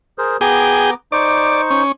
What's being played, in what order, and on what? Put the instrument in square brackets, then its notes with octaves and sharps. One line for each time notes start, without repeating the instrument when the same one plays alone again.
[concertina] G#4 A#4 C5
[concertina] B3 A#5 D6 [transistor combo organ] G#4 G5
[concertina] D#4 C5 C#6 [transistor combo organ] D5
[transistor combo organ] C#4